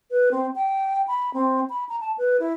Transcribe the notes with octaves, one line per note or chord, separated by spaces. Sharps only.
B4
C4
G5
B5
C4
B5
A#5
A5
B4
E4